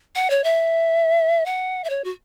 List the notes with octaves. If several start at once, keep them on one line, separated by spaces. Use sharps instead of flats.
F#5
C#5
E5
F#5
E5
C#5
F#4